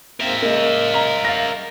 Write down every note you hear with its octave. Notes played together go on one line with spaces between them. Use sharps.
G#2 A#3 C4 A#4 E5
C#3 G#3 A#3
A#5
F5 A6 A#6